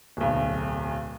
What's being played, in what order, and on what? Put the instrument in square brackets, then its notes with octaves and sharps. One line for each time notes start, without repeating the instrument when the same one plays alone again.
[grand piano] D1 B1